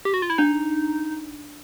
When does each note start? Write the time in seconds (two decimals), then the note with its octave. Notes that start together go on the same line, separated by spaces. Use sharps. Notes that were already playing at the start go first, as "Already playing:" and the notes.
0.05 G4
0.14 F#4
0.22 F4
0.30 E4
0.38 D4 D#4